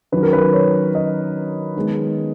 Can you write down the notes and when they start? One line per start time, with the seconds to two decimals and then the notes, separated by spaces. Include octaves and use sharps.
0.12 D#3 F#3 C#4 B4
0.23 A#4
0.33 B4
0.53 C#5
0.95 D#5
1.77 D#3 G#3 B3